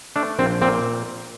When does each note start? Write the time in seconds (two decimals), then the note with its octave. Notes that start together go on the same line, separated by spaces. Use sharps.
0.16 A3 D4
0.39 A#1 C4
0.61 A#2 C4